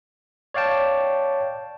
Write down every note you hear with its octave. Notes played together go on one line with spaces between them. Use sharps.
C#5 D5 F5 G5 A5